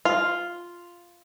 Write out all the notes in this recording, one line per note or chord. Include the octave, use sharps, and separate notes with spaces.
F4